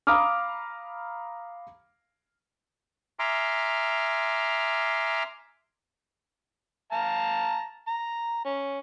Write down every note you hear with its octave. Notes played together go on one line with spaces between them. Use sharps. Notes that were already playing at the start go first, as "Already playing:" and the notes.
F5 A#5 B5 D6 D#6 F6
E5 G#5 A#5 C6 D6 F6
F5 A5 A#5
A#5
C#4